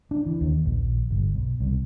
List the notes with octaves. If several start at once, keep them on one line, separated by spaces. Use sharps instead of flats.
D4
E3
D#2
A#1
G1
B1
C2